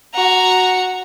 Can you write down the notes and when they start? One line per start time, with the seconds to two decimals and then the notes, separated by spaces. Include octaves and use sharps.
0.14 F#4 A#5